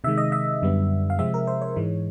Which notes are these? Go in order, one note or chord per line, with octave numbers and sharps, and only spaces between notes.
C3 D#3 G#3 E5
D#5
E5
F#2 D3 G3 B3
F5
C3 F3 G#3 C4 E5
A#4
C5
C#5
G#2 E3 G#3